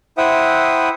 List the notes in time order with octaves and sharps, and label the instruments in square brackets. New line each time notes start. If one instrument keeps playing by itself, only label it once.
[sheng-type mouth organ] E4 C5 E5 F#5 G5 D#6